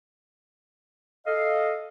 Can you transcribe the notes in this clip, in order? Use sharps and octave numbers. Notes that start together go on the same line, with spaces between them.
A4 D#5 F5